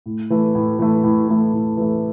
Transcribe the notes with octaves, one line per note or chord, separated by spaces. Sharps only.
A2
E3 A3
A2
E3 A3
A2
E3 A3
A2
E3 A3